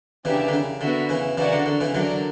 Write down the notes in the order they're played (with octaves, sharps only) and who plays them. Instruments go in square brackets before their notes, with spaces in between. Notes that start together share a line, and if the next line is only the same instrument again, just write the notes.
[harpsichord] C#3 E3 [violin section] B3 D4 G4 A#4 E5
[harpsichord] D3
C#3
[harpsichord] D3 [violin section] B3 F#4 A#4 E5
[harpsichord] C#3 E3
[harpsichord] C#3 E3 [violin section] F#4 A#4 D5 F#5
[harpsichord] D3
D3
C#3 E3
[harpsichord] D3 F#3 [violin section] D4 A#4 D5